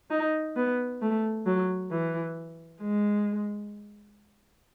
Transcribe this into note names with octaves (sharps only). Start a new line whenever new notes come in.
D#4
B3
A3
F#3
E3
G#3